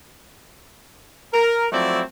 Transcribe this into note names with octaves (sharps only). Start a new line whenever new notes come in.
A#4
F3 F#3 A3 C4 E4 D5